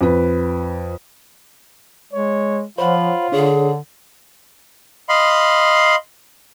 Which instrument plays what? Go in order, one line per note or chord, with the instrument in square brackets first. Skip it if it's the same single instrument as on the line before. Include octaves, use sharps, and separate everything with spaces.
[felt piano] F2 B4
[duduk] G#3 [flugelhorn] C#5
[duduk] F3 [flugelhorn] F4 [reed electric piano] C5 C#5 F#5 [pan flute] B5
[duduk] D3 [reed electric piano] D4 C#5 [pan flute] G#4
[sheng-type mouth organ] D#5 F5 B5 C6